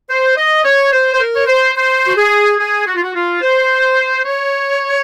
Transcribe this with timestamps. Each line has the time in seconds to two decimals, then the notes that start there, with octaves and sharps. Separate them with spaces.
0.09 C5
0.36 D#5
0.65 C#5
0.92 C5
1.14 C5
1.20 A#4
1.36 C#5
1.47 C5
1.76 C5
2.07 F#4
2.17 G#4
2.59 G#4
2.86 F#4
2.95 F4
3.04 F#4
3.15 F4
3.41 C5
4.25 C#5